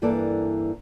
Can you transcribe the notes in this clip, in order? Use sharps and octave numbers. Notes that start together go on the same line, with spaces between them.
G2 E3 A#3 A4 D5